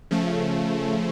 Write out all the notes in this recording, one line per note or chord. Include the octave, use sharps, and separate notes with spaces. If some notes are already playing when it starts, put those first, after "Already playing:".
C#3 F3 A3